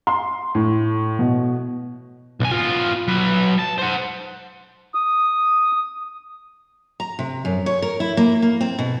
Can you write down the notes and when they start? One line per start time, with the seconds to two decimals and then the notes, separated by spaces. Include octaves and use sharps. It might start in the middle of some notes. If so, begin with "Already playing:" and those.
0.07 C6
0.55 A2
1.19 B2
2.40 B1 G#5
2.51 B3 F4
3.08 F#3 B4
3.59 A5
3.78 C5 F#5
4.95 D#6
7.00 A#5
7.19 C3
7.45 F#2
7.66 C#5
7.82 A#4
8.00 E4
8.17 A#3
8.42 A#3
8.61 C4
8.79 B2